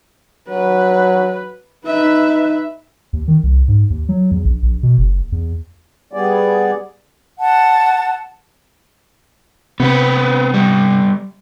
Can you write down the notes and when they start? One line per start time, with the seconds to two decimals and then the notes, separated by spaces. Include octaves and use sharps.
0.49 F#3 B4
1.86 D#4 B4 E5
3.13 D#2
3.28 D#3
3.43 C2
3.68 G#2
3.90 D#2
4.09 F#3
4.31 E2
4.45 A#1
4.63 A#1
4.83 B2
4.98 F#1
5.32 E2
6.13 G3 B3 G#4 D5
7.38 F#5 A5
9.80 C3 B3 C4 B4
10.54 G3 B3